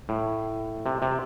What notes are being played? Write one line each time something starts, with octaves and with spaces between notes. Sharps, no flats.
A2
C3
C3